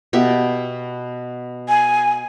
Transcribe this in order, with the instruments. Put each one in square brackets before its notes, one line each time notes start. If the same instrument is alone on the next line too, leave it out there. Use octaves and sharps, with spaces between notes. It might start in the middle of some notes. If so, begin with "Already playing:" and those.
[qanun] B2 G4 E5
[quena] G#5